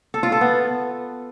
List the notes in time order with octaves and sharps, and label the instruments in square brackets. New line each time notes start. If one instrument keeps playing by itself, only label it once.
[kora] A4
F4
A4
B3